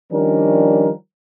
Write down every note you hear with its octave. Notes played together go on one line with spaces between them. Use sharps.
D#3 F3 G3 C#4 D4 A#4